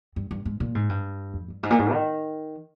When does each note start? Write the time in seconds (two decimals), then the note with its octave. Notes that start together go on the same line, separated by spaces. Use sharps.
0.16 G2
0.31 G2
0.45 G#2
0.60 A#2
0.75 G#2
0.89 G2
1.34 F2
1.48 G2
1.63 G#2
1.70 A#2
1.79 G#2
1.92 D#3